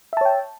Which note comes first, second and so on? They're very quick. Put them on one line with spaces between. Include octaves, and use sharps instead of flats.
E5 A5 C#5 G5